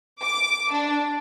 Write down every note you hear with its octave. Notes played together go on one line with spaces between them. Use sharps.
D6
D4